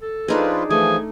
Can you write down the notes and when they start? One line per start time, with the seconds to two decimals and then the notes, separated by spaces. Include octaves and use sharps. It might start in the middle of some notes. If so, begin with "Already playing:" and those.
0.02 A4
0.28 F3 D4 D#4 F4 G#4 B4
0.70 E3 F3 A3 G#4